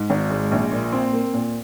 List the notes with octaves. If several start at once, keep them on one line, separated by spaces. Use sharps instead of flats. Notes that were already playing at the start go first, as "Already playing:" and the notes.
Already playing: G#2
G#1
G#3
A#1
A#2
C4
A#3
A#2